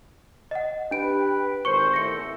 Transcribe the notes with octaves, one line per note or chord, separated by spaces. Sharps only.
D#5 F#5
D4 G4 B4 D7
G#1 A#2 C5 C#6 C#7
G#1 E2 A3 A#6 C#7